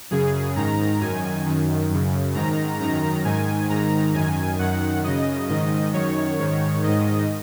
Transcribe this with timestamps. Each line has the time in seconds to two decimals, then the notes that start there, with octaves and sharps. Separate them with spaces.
0.11 F#2 C#3 G#4
0.56 G#2 D#3 A#5
1.01 F#2 D#3 G#5
1.46 F#2 D#3
1.90 F#2 C#3
2.35 G#2 D#3 A#5
2.79 F#2 D#3 A#5
3.25 G#2 D#3 G#5
3.69 G#2 D#3 A#5
4.14 F#2 D#3 G#5
4.59 F#2 D#3 F#5
5.04 F#2 C#3 D#5
5.49 G#2 D#3 D#5
5.93 F#2 D#3 C#5
6.39 G#2 D#3
6.83 G#2 D#3 D#5